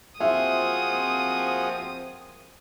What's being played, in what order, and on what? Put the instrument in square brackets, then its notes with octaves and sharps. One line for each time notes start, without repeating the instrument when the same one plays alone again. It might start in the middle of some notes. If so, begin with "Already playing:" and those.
[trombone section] F3 A#3 C4 [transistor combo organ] F4 F#4 G#4 [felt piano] E5 [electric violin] D#6